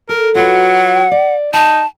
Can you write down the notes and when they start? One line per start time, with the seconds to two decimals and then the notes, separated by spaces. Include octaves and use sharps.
0.09 A4 A#4
0.35 F#3 F4 F#4 B4 F#5
1.11 D5
1.54 D#4 G5 A5 A#5